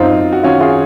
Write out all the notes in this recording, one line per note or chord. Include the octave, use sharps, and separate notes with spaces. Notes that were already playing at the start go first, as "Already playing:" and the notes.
Already playing: F#2 C4 D#4 F4
F#2
F#4
D#3 C#4 F4
F4 G#4